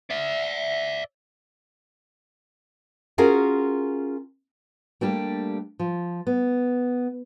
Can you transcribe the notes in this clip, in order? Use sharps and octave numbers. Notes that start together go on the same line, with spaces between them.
D5 E5
C#4 F4 F#4 G#4 A#4
G3 A3 A#3 D4 G4
F3
B3